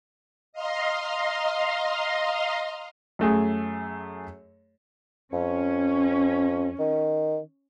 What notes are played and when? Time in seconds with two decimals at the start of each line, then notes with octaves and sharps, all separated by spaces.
0.53 D#5 F5 A#5 C6
3.19 F#2 A3 G#4
5.33 F2 C#4
6.79 D#3